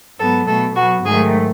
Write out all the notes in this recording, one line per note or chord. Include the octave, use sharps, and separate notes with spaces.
G#2 F#3 B3 A4
B2 A3 A4
B2 F#3 B3 F#4
G#2 D#3 F#3 A3 G#4